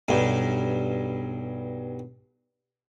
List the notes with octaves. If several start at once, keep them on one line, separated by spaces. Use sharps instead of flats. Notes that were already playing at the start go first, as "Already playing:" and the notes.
B1 G2